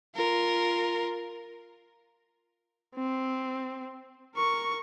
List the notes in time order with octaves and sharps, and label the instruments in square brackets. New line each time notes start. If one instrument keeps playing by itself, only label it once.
[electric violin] F4 A#4
C4
A#4 C#6